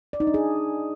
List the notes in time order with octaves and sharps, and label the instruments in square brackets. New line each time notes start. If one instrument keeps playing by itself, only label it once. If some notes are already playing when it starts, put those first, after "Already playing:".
[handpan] D5
D#4
D4
G#4